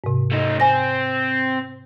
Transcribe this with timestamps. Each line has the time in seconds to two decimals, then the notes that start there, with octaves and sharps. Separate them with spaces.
0.04 G#2 C3
0.31 A3 D#4
0.60 C4 G#5 A#6